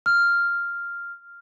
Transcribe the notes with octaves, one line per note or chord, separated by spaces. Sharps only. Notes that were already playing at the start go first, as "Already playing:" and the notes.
F6